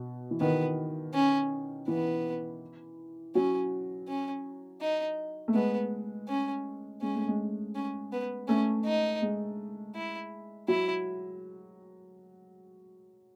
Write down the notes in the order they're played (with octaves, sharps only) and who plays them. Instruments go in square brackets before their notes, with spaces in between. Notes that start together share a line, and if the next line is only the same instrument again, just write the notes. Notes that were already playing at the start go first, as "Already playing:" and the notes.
Already playing: [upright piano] B2
E3
[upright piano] D#3 [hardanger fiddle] B3
[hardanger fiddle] C#4
[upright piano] E3 [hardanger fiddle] B3
[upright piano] F#3 [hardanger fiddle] C#4
[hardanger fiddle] C#4
D#4
[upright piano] A3
[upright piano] G#3 [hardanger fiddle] B3
[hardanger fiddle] C#4
[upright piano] G#3 [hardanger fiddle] C#4
[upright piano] A3
G#3
[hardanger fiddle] C#4
B3
[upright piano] A3 [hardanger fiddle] C#4
[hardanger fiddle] D#4
[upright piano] G#3
[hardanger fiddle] E4
[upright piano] F#3 [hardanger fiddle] E4